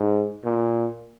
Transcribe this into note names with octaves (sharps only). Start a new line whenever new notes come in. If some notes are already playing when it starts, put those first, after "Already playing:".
Already playing: G#2
A#2